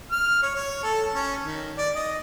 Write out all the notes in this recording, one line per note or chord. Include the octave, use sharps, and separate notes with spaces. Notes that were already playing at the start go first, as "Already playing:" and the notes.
F6
C#5
C#5
A4
C#4
D#3
D5
D#5